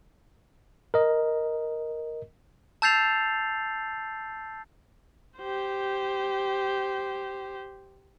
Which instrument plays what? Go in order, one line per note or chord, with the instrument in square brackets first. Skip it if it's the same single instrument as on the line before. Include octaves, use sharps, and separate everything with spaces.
[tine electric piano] A#4 D#5
[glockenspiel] A5 E6 G6 A6 C7 F7
[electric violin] G4 C5